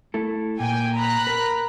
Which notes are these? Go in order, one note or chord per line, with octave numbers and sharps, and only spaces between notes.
A3 E4 A4
A#2 G5 G#5
A#5 B5 F#6
A#4 B4